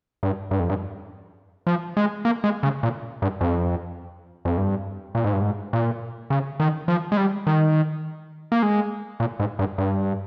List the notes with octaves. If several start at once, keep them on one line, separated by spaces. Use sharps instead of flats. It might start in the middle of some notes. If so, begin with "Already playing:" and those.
G2
G2
F2
G2
F3
G#3
A#3
G#3
C#3
A#2
G2
F2
F2
G2
A#2
G#2
G2
G#2
A#2
C#3
D#3
F3
G#3
G3
D#3
A#3
G#3
A#2
G#2
G2
G2